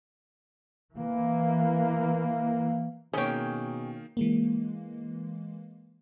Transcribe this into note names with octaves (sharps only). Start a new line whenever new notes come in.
E3 A#3
B2 D#3 A#3 C#4 G#4 C#5 G5
E3 G#3 A#3